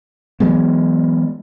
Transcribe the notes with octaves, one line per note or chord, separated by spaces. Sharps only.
E3 F#3 G#3 B3